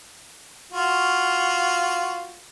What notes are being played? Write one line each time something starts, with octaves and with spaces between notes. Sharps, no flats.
F4 F#4